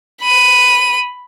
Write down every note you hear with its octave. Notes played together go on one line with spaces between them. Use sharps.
B5 D#7